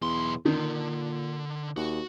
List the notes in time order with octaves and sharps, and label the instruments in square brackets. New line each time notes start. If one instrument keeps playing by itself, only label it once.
[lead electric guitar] B1 C6 [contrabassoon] E2
[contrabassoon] A#2 [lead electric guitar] D3 [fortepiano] D#3
[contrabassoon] D#2 [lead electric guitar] F#4